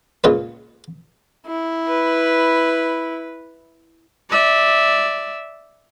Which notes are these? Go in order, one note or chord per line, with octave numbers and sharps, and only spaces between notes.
C#2 A#2 F4 B4
E4
B4
D5 E5